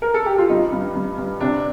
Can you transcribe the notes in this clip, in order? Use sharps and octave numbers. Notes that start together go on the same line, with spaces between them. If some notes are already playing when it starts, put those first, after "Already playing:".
A#4
A4
G4
F4
G2 D#4
G2
G2
G2
C3 D4